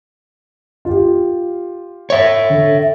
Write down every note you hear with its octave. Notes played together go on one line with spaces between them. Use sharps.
F4 G4
C#5 E5
D3